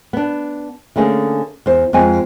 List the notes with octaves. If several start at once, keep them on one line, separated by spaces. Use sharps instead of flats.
B3 D4
D3 A3 A#3 C#4 G#4
E2 C5
F2 G#3 C4 G#5